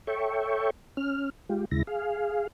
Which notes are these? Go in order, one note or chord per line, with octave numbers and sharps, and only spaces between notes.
A4 C#5 E5 G5 C#6
C#4 F6
G#3 F4 G4
D#2 C#3 G#3 E4 A#6
G#4 F5